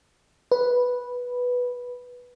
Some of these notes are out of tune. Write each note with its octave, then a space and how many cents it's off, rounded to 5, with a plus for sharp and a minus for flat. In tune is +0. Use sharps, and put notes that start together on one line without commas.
B4 -5